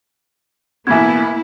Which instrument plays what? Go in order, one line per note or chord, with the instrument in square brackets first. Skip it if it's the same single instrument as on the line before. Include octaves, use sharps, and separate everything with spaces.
[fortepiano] A1 B2 [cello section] A#3 B3 E4 [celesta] G#5 G#6